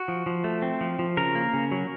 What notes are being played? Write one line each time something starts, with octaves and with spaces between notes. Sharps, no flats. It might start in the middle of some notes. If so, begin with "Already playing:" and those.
Already playing: F#4
F3
F3
A3
C4
F3
F3
C#3 A#4
A#3
C#3
F#3